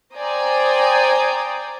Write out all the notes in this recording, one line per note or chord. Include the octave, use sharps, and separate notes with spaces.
C5 D5 G5 G#5 A#5 D#6